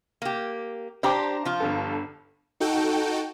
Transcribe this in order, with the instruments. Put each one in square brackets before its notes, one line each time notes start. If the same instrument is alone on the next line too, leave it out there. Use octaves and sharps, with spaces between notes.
[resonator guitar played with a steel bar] A#3 G4
[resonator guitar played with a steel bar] D4 G4 [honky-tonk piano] C5 A#5 D6
[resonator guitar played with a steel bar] F3 F4
[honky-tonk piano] G1 G2 A4
[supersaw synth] D#4 F#4 A4 G5